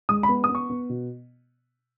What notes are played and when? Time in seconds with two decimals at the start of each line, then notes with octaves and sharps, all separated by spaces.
0.09 G#3 D#6
0.23 B5
0.29 B3
0.44 D#6
0.49 B3
0.55 C#6
0.70 B3
0.89 B2